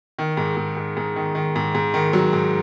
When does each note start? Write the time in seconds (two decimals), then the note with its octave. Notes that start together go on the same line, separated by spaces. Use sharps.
0.19 D#3
0.37 G#2
0.57 G#2
0.77 G#2
0.97 G#2
1.16 D#3
1.35 D#3
1.56 G#2
1.75 G#2
1.94 D#3
2.13 F#3
2.33 G#2